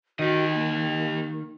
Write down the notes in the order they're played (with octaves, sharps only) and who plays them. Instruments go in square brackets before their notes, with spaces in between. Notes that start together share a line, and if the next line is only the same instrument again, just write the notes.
[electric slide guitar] D#3 [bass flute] F#4 [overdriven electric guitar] G4 D#5
[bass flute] A#3